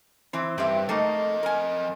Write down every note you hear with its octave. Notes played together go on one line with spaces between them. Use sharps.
E3 C4
G2 C4 G4 E5
F2 A3 A#3 D#4 D#5
A#4 G#5